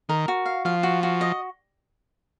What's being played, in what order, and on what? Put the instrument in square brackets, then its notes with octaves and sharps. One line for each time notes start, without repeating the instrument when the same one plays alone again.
[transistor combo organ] D#3 [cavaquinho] A#4
[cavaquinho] F#4
F5
[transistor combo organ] F3 [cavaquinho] F5
[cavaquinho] F#4
F#4
D#5